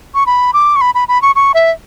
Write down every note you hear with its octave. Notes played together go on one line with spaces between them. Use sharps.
C#6
B5
D6
C#6
B5
B5
B5
C#6
C#6
E5